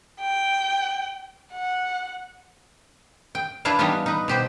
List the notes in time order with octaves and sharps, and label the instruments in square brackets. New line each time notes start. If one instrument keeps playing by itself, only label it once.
[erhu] G5
F#5
[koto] G5
D4 E4 F4 B4 F5
E3 G3 B3 D4 D#4 F4
D#4 B4
B2 G4 C5